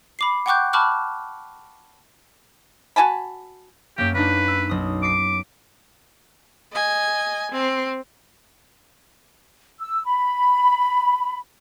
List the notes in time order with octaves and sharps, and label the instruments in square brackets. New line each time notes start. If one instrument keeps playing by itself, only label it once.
[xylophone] B5 D6 C7
F#5 G5 C#6 D6 F#6 G6
A5 B5 C#6 D6 F6 F#6
[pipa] F#4 G#5 A5 B5
[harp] F#2 A#3 [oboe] G4
[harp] A#3 D4 D#4 [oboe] B4
[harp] E6
B1 D#6
[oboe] D6 [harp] B6 C7 D7
[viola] D#5 G#5
C4
[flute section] E6
B5